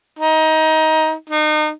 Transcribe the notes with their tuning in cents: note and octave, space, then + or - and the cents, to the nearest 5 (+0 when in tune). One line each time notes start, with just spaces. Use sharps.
D#4 +20
D#4 -35